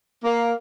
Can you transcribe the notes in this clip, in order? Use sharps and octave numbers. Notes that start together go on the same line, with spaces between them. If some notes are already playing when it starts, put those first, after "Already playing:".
A#3